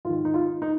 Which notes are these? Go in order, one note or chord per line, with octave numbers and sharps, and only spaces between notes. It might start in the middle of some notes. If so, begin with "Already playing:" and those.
G#2 D#3 F4
D#4
F4
D#4